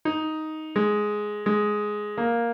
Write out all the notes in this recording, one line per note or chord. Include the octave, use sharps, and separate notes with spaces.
D#4
G#3
G#3
A#3